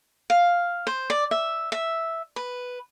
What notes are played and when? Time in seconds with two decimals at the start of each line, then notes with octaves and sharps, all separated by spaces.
0.30 F5
0.87 C5
1.10 D5
1.31 E5
1.72 E5
2.36 B4